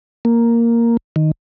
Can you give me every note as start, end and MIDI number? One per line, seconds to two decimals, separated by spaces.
0.25 0.97 58
1.16 1.31 51